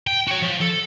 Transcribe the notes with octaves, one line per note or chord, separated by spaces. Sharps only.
G5
F#4 C#5
F3
A4